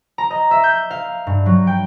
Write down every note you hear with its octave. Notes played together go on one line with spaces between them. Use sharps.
A#5
D#5
E5
G6
F5
G2
F#3
G5